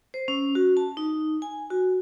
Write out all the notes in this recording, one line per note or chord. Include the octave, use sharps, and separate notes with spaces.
C5
C#4
F#4
A5
D#4
G#5
F#4